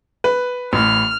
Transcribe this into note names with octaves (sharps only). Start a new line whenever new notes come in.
B4
A1 A2 F6